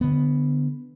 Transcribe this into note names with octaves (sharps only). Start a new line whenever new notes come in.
D3 B3